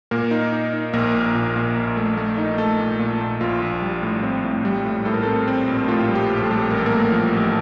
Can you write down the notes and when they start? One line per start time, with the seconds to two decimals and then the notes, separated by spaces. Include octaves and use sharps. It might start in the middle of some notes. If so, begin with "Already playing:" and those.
0.11 A#2 A#3 A#4
0.31 D#4
0.53 D#4
0.73 D#4
0.93 A#1 A#3 A#4
1.15 A#2
1.35 A#2
1.56 A#2
1.76 A#1
1.97 A3
2.17 A3
2.38 D#4
2.58 A3 A4
2.80 A#2
2.99 A#2
3.21 A#2
3.41 A#1 F4
3.62 A#1
3.82 G3
4.02 A2
4.23 C4
4.44 A2
4.65 G3
4.85 A2
5.05 A2 A4
5.14 A#4
5.22 A3 C4 A4
5.48 C4
5.68 A#1
5.88 A2 F4
6.09 G3
6.15 G4
6.30 A#1
6.43 A3 A4
6.51 G3
6.70 A1 A#4
6.78 A4
6.86 A3 A#3 A#4
7.11 F3
7.33 A1